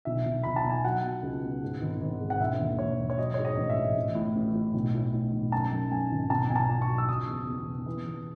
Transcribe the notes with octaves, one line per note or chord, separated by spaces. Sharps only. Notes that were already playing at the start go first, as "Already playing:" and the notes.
B1 E5
B1
B1 B5
A5
B1
G#5
F#3 F#5
B2
C#2
B2
G#2
G#1
G#1
G#2
F#5
E1 E5
D#2
E1 C#5
E1
C#5
F#3 D#5
G#2 C#5
D#5
A1
E5
A1
A1
A2
A1
A2
B1
A2
A2
B1
F#2 A5
F#2
F#2 G#5
G#1
B1 A5
B1 G#5
A5
B1
C#6
F#3
E6
F#1 D#6
E2
E2
B2
E3
E3